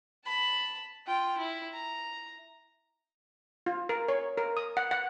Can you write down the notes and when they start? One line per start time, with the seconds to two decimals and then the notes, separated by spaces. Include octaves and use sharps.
0.25 A5 B5
1.07 F4 G5
1.38 E4
1.73 A#5
3.66 F4
3.89 A#4
4.08 C#5
4.38 A#4
4.57 D#6
4.77 F#5
4.91 F#5